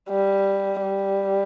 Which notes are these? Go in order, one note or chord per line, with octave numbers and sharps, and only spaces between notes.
G3
G3